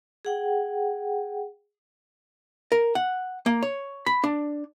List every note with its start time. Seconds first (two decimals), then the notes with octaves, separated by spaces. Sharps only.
0.25 G#4 F#5 G5
2.72 A#4
2.95 F#5
3.46 A#3
3.63 C#5
4.06 B5
4.24 D4